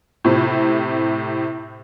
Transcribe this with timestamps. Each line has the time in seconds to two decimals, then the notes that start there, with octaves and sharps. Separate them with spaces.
0.24 A2 C3